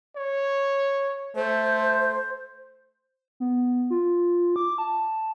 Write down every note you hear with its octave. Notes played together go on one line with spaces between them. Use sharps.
C#5
A3 C5
B3
F4
D6
A5